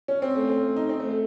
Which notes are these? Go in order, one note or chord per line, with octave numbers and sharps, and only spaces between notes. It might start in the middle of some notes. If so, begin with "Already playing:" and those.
C#4
C4
A3
C4
D#4
C4
A3
A3